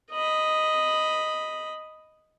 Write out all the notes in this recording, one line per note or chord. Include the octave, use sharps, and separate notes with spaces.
D#5 B5